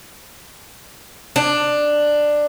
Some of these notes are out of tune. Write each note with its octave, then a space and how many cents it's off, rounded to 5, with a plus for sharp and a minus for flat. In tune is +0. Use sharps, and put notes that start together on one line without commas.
D4 +10